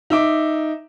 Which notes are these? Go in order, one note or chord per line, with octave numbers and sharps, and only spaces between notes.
D#4 E5 D6